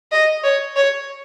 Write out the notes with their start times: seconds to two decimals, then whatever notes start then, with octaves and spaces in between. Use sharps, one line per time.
0.12 D#5
0.44 C#5
0.76 C#5